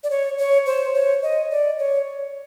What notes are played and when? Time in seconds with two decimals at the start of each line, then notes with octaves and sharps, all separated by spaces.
0.04 D5
0.10 C#5
0.38 C#5
0.66 C5
0.94 C#5
1.22 D#5
1.51 D5
1.79 C#5